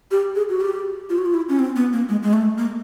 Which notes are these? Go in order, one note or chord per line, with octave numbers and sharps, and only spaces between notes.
G4
G#4
F#4
G4
F4
F#4
F4
E4
C#4
C4
B3
A#3
G#3
G#3
A3
A#3